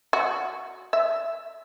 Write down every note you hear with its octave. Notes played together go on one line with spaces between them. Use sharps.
F#4
E5